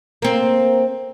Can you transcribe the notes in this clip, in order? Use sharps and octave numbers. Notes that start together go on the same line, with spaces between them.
A#3 C4